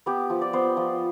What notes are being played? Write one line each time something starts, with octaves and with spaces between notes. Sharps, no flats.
B3 G4
F3
D5
B3 C5
F3